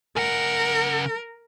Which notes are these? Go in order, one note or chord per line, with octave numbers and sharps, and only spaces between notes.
C#3 A#4 F#5